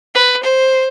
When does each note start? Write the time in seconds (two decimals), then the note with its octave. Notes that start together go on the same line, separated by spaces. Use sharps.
0.15 B4
0.43 C5